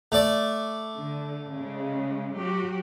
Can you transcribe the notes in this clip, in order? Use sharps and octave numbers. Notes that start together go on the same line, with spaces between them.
A3 D5
D3
C#3 G#3
F#3 F#4 G4